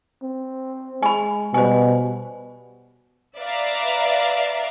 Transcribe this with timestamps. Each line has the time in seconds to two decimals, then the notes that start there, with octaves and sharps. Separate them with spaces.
0.23 C4
1.03 G#3 G#5 B5
1.54 B2 G3 C5 G#5
3.36 B4 D5 E5 F5 A#5